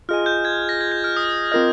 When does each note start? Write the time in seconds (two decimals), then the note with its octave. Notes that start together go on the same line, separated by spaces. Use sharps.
0.09 F4 G#4 D#5 G#5 F6
0.26 G6
0.45 G#6
0.69 A#6
0.81 G#6
0.92 G6
1.04 F6
1.17 D#6
1.52 C4 F4 A#4 D#5 F6